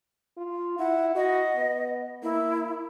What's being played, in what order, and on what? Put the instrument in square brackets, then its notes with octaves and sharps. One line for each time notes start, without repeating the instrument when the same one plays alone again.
[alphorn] F4
[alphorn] E4 [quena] F#5
[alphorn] F#4 [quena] D#5
[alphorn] B3
[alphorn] A#3 [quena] E4